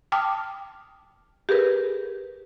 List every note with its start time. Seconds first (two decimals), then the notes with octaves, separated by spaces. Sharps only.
0.12 G5 A5 D6 D#6 F6
1.49 G4 G#4 A#4 B4